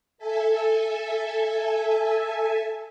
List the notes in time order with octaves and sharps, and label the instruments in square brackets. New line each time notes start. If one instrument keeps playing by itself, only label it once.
[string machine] A4 E5 G#5